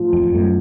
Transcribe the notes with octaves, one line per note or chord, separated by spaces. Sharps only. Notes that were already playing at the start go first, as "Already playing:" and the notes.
Already playing: A2 F3
F2
F2
F#2 A3